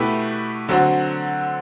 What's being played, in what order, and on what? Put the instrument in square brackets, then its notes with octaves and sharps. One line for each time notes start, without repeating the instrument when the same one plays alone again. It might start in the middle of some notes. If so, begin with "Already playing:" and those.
Already playing: [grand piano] B2 A3 E4 G4 B4
D3 F#3 C4 F#4